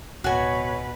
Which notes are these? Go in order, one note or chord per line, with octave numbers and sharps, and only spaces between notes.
D1 B2 F#4 B4 C#5 G#5